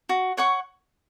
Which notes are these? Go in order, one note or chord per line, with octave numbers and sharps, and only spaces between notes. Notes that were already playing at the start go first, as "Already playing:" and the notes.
F#4
C#5 F#5 C#6